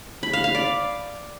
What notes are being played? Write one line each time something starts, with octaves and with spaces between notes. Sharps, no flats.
B5
F5
F5
D5